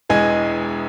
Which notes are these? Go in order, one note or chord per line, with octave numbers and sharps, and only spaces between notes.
E1 E2 E3 G#3 G#5